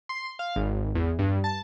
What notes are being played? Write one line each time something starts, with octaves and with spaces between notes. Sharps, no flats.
C6
F5
G#1
E2
G2
A5